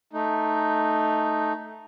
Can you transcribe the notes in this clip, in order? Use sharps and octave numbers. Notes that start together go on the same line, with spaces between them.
A3 D#4